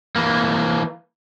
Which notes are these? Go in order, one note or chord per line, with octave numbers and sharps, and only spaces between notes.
E3 A#3